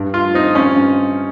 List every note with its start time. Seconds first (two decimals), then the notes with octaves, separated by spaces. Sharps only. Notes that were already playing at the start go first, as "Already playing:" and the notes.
Already playing: G2
0.14 F4
0.34 C4 D#4
0.55 C#4
0.76 G2